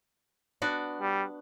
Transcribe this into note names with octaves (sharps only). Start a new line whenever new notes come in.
B3 D4 F#4
G3